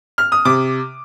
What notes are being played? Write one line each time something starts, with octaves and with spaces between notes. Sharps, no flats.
F6
D#6
C3 D6